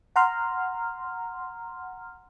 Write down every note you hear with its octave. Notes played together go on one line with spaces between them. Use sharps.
F#5 A#5 C6 F6